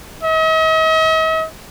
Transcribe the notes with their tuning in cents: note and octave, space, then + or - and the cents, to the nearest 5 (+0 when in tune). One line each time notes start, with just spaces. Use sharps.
D#5 +45